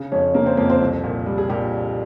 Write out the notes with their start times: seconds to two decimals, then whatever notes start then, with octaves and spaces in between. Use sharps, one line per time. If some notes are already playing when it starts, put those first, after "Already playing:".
Already playing: C#3
0.12 F2 C#4 C#5
0.35 C#3 A#3 A#4
0.46 C4 C5
0.57 F2 A#3 A#4
0.69 C4 C5
0.81 C2
1.04 A#2
1.26 G3
1.38 G#4
1.49 A#2 G3 G4